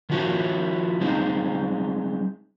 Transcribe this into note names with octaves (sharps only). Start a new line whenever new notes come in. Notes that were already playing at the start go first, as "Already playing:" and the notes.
D#3 F3 E4 F#4
G3 G#3 C4 D#4